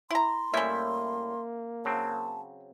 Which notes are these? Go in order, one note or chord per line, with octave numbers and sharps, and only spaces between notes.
E4 A#5 C6
A2 G3 A#3 C#4 E4 E5
C#3 F#3 C4 A5